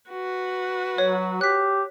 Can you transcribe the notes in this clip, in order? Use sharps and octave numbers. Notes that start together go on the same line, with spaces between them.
F#4 B4
F#3 C#5
G4 F#6 B6